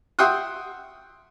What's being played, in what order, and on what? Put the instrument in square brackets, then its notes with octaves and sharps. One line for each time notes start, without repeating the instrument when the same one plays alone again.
[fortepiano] E5 F#5 G5 C6 D#6 F#6